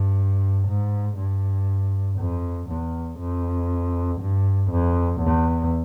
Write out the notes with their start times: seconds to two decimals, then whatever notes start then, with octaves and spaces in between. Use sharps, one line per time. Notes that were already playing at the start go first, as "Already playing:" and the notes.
Already playing: G2
0.68 G#2
1.18 G2
2.19 F2
2.69 E2
3.19 F2
4.20 G2
4.71 F2
5.20 E2